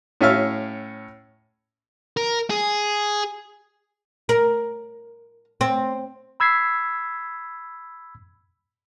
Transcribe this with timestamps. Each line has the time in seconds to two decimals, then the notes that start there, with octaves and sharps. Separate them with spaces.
0.21 A2 C#4 E5 F5 F6
2.17 A#4
2.50 G#4
4.29 A#4
5.61 C4
6.40 B5 E6 G#6 B6 C7